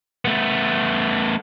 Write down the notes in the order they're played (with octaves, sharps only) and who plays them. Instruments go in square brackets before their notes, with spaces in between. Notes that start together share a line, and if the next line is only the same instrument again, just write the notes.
[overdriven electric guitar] A3 B3